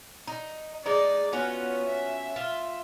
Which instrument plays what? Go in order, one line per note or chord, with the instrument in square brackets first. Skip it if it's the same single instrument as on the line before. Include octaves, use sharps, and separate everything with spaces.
[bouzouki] D#4
[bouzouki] G#3 D#4 [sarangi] D5
[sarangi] B3 [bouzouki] C#4 F4 F#4
[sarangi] E5
[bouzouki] F4